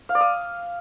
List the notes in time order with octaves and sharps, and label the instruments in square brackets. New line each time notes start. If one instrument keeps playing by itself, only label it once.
[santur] F5
D5
D#6